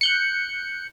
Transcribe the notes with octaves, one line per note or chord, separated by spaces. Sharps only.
F#6 G6 C#7